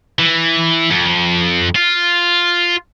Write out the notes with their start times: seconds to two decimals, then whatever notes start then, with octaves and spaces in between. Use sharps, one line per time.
0.19 E3
0.90 F2
1.75 F4